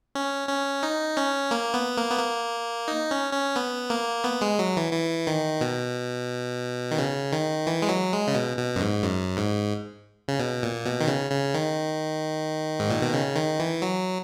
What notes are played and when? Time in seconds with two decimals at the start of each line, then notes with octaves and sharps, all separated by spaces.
0.15 C#4
0.49 C#4
0.83 D#4
1.17 C#4
1.51 A#3
1.74 B3
1.98 A#3
2.10 B3
2.19 A#3
2.88 D#4
3.11 C#4
3.33 C#4
3.56 B3
3.90 A#3
4.24 B3
4.41 G#3
4.59 F#3
4.77 E3
4.93 E3
5.27 D#3
5.61 B2
6.91 D#3
6.99 C#3
7.33 D#3
7.67 E3
7.82 G#3
7.89 F#3
8.13 G#3
8.27 C#3
8.35 B2
8.57 B2
8.76 F#2
8.81 G#2
9.03 F#2
9.37 G#2
10.28 C#3
10.39 B2
10.63 A#2
10.86 B2
11.00 D#3
11.08 C#3
11.31 C#3
11.54 D#3
12.80 G#2
12.90 A#2
13.02 B2
13.13 C#3
13.35 D#3
13.59 E3
13.82 F#3